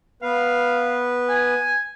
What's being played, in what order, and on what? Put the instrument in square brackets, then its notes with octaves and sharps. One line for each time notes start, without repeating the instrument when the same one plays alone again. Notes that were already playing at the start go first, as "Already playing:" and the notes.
[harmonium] B3 B4 [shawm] F5
[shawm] G#5